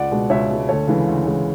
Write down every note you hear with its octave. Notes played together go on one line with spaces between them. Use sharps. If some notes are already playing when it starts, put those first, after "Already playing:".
Already playing: C#2 D5 F#5
B2 G#3
C#2 C#5 E5
B2 G#3
D2 A4 C#5
C#3 E3 G#3
D2
C#3 E3 G#3